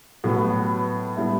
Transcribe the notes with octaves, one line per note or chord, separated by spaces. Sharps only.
A2 F#3 B3
A2 G3 B3 E4